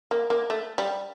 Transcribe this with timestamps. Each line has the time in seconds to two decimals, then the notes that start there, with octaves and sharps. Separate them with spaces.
0.11 A#3
0.30 A#3
0.50 A3
0.78 G3